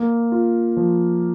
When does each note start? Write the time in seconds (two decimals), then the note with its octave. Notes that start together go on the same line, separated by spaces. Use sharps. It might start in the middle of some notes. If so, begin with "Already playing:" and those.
Already playing: A#3
0.32 F4
0.77 F3